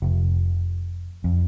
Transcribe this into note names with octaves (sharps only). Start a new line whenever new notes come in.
F1
F2